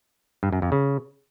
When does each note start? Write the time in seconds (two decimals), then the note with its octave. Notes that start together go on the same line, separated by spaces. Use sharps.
0.43 G2
0.53 F#2
0.62 F2
0.72 C#3